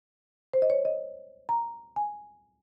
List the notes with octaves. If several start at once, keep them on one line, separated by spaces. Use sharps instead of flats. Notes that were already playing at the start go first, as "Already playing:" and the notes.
C5
D#5
C#5
D#5
A#5
G#5